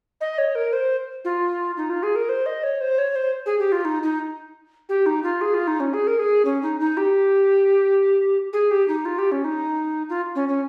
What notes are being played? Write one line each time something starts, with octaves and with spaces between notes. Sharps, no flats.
D#5
C#5
A#4
C5
F4
D#4
F4
G#4
A#4
C5
D#5
C#5
C5
C#5
C5
G#4
G4
F4
D#4
D#4
G4
D#4
F4
G#4
F4
D#4
C#4
G#4
A#4
G#4
C#4
D#4
D#4
G4
G#4
G4
D#4
F4
G4
C#4
D#4
F4
C#4
C#4